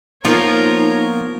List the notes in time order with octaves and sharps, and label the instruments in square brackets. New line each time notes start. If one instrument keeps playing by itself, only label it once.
[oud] F3 F4 [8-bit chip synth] A#3 B3 [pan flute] D#4 [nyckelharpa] A#4 C#5